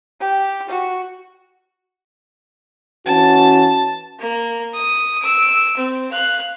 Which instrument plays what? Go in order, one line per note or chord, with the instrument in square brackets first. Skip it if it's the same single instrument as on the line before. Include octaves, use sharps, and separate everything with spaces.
[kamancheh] G4
F#4
[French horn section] E3 C#4 F#4 [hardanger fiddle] A5
[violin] A#3
D#6
E6 D7
C4
F5 F#6